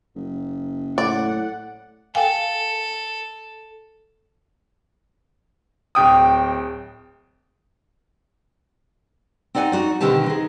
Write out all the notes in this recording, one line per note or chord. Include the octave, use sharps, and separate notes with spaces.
F#1
A2 D5 F#5
A4 F5 G5 G#5
D1 G5 D#6
C4 D#4 D5 F#5 G#5
D#4 F#4 D5
B2 D3 D#3 C4 G4 A5
D#4 G#4